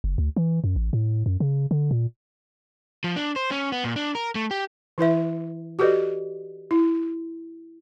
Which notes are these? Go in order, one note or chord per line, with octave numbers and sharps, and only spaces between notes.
F#1
D2
E3
F#2
A1
A2
F#2
C#3
D3
A#2
F3
D4
C5
C#4
B3
A#2
D4
A#4
A3
G4
E3 E4 B4 E5
F#4 G4 A4 B4 D5 D#5
E4